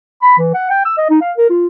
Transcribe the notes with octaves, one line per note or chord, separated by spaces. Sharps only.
B5
E3
F#5
G5
E6
D#5
D#4
F5
A#4
F4